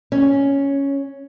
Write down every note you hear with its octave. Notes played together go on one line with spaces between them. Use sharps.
C#4